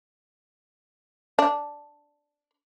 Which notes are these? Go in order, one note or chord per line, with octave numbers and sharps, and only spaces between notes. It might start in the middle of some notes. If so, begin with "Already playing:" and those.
D4